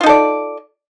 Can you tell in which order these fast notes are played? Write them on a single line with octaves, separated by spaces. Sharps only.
F4 D#4 A4 D5